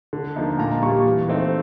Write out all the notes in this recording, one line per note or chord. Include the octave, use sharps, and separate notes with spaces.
D3
F3 A#3 D#4
A#2 A#5
G3 A#3 C#6
E3
A3 C4 D#4